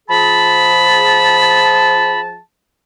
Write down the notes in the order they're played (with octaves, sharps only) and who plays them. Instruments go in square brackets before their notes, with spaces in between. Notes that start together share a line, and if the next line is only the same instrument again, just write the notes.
[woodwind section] F3 G#4 A5 [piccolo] B5